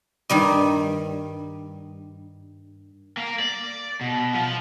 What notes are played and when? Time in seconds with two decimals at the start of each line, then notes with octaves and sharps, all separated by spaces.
0.30 G2 D#3 G3 D#5
3.17 A#3
3.40 D5
4.01 B2
4.34 F3